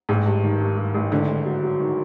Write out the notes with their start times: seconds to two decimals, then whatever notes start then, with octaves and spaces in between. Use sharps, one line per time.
0.09 A1 G#2
0.26 G2
0.43 D#3
0.60 G2
0.77 G2
0.94 A1
1.12 G#1 D3
1.28 G#1
1.46 F#3
1.63 F#3
1.80 D#3